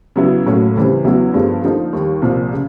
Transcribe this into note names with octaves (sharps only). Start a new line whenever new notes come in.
C#3 F#3 B3 E4
A2 F#3 A#3 C#4
C#2 C#3 E3 G3 C4
E2 C#3 F#3 B3 E4
G2 D3 F3 G#3 B3
D3 F3 A#3 D#4
D#2 D#3 G3
C2 A#2 F3 A#3
C#3